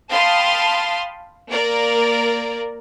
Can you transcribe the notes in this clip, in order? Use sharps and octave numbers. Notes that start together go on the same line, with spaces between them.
F5 G5 A5 B5 C6 D#6
A#3 A#4 D5